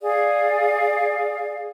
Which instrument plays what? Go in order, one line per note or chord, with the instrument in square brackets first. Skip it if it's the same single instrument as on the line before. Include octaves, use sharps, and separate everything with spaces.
[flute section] G#4 D5 F5